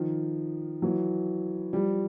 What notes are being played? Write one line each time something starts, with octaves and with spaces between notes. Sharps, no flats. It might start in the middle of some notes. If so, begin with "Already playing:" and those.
Already playing: D#3 F3
E3 F#3
F3 G3